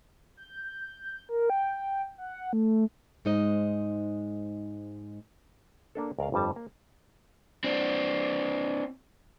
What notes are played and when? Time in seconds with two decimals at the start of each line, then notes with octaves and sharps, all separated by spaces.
0.37 G6
1.29 A#4
1.50 G5
2.18 F#5
2.53 A3
3.25 G#2 G#3 D#4 C5 D#5
5.95 A#3 D4 A4
6.19 C#2 A#4 D5 F5
6.32 G1 F2 G3 A5
6.56 A#3
7.64 C4 D4